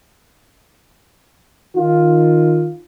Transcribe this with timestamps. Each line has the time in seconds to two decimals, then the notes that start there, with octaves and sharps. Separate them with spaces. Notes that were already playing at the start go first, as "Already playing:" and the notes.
1.76 D#3 F4